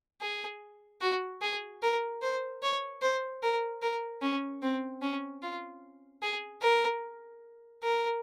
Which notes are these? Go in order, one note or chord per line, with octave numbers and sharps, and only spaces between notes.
G#4
F#4
G#4
A#4
C5
C#5
C5
A#4
A#4
C#4
C4
C#4
F4
G#4
A#4
A#4